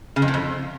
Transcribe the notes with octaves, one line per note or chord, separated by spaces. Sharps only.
C#3
F2
A2
F2